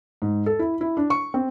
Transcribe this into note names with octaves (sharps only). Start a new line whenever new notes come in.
G#2
A4
E4
E4
D4
C#6
C4